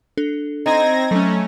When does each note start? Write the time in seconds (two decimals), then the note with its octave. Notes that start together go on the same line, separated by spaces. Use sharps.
0.17 D4 A4
0.66 C4 D#4 G#6 A#6
1.11 F#3 A3 C#4